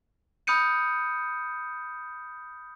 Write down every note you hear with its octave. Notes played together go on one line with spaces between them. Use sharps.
B5 D#6 F6 G6 C#7 D#7